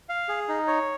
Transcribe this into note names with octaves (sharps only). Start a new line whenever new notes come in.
F5
G#4
D#4
C#5